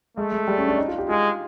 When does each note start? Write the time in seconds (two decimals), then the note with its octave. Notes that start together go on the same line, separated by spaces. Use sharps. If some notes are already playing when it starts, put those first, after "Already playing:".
0.17 G#3 A3
0.32 G#3
0.47 G3
0.58 C#4
0.68 D4
0.78 D#4
0.88 F4
0.98 G4
1.08 G#3 F4